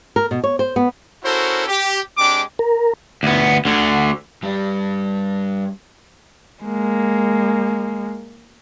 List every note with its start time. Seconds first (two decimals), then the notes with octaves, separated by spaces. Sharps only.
0.16 A#4
0.31 B2
0.44 C#5
0.59 C5
0.76 B3
1.24 C#4 E4 F#4 A4 A#4 C5
1.68 G4
2.17 G#3 C4 D4 G4 D6
2.59 A#4
3.23 D2 B3
3.65 D2 D3
4.43 G2 G3
6.63 G#3 A#3